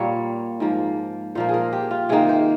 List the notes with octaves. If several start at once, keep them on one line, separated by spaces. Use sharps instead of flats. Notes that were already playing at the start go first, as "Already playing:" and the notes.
Already playing: A#2 G3 A#3 C#5
G#2 F3 A#3
A#2 F3 A#3 C5
G#4
A#4
G4
F4
C3 D#3 A#3 G#4
C5